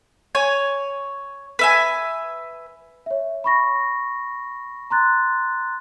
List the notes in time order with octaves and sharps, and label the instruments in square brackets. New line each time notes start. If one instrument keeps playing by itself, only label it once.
[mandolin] C#5 G#5
B4 E5 G#5
[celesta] C#5 E5
B5 C#6 A#6
A#5 C6 F#6 A6